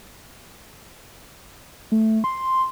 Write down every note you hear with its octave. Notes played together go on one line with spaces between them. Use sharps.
A3
C6